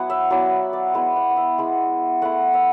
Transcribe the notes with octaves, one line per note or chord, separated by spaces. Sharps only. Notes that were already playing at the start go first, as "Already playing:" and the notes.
Already playing: F#3 B3 E4 F#5
E5
F#3 B3 E4 D5
D5
G#3 B3 E4 E5
F#5
F#5
E5
G#3 B3 E4
A3 E4 F#5
E5